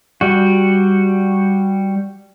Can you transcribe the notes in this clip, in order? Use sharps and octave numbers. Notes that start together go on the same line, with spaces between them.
G3 F#4